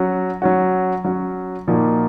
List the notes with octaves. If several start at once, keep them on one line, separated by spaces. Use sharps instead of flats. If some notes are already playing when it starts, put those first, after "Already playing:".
Already playing: F#3 C#4 F#4
F#3 C#4 F#4
F#3 C#4 F#4
A#2 F3 A#3 D#4 F#4